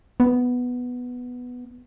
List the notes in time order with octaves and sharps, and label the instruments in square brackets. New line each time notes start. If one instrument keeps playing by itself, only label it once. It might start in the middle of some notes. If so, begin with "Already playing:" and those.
[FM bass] B3